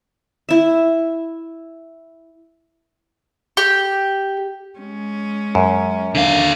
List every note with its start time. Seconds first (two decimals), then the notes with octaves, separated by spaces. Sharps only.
0.49 E4 E5
3.57 G4
4.79 G#3 C#4
5.55 F#2
6.15 D#2 D3 D4 F5